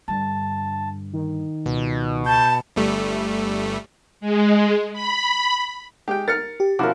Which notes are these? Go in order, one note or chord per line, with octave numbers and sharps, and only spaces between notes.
G2 D3 A5
D#3
C#2 B2
A5 G6
G1 G3 A3
G#3
B5
G#3 G4 G5
A#4 F6 A6 C#7
G4
B2 F3 C#4 E4 F#4 A#4 D6